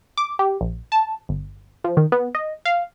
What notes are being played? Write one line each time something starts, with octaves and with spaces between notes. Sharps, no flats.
D6
G4
A#1
A5
G1
F3
D#3
B3
D#5
F5